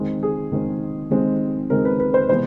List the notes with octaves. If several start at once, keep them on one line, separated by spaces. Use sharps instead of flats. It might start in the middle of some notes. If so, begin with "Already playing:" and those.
Already playing: D#3 G#3 C4
G#4
D#3 G#3 C4
D#3 G#3 C4
D#3 G#3 C4 A#4
B4
B4
C5
C3 E3 G#3 B3 C5